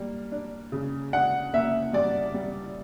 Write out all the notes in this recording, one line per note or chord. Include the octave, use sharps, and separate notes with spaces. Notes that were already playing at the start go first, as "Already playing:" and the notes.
Already playing: G3 A#3
D4
C#3
D4 F#5
A#3 E5
G3 D5
G3